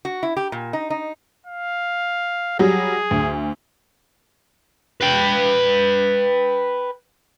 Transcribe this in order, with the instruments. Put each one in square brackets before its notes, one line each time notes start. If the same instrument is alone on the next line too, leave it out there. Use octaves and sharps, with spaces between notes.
[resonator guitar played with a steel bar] F#4
E4
G4
A#2
D#4
D#4
[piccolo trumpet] F5
[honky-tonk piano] F#3 G3 [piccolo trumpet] G#4
[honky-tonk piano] D2
[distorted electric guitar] B4 G5